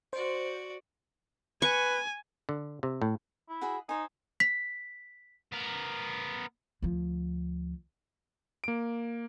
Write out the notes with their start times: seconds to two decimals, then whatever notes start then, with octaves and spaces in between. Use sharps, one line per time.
0.13 F#4 C5 D5
1.62 B4 G#5 C#6
2.49 D3
2.83 C3
3.02 A2
3.49 E4
3.61 F#4 G#4 B5
3.89 D#4 C5 G#5
4.40 B6
5.52 B3 A#4
6.82 D2 F3
8.64 A#3 D7